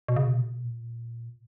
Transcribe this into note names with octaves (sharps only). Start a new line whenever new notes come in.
B2
C#3
B2
A#2
B2
A#2